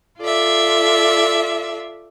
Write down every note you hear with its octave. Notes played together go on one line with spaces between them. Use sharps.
F4 A4 D5 E5